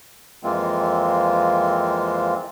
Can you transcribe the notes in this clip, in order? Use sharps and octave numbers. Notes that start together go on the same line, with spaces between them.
F2 E3 G#3 A#3 C4 F4